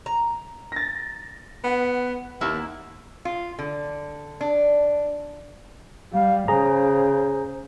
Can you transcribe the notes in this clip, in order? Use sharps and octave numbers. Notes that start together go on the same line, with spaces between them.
A#5
A6 A#6
B3 F#5
D#2 A#3 E4
F4
D3
D4
G3 F5
C#3 G#4 C5 A#5